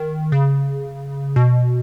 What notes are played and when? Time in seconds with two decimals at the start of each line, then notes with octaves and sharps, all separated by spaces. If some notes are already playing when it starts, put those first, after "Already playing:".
Already playing: D#3
0.32 C#3
1.36 B2